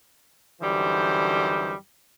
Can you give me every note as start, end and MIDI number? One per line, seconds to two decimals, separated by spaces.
0.61 1.74 42
0.61 1.74 50
0.61 1.74 52
0.61 1.74 55
0.61 1.74 63
0.61 1.74 72